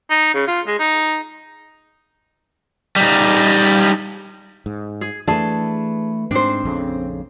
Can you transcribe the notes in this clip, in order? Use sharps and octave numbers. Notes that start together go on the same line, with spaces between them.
D#4
C#3
F4
G#3
D#4
G3 D#4
G#2
G#4
E3 A3 D4 G#4 B4 A5
G#2 C4 D4 C5
A#1 F2 C#3